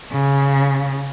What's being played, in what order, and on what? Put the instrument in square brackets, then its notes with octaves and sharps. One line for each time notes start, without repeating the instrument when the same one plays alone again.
[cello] C#3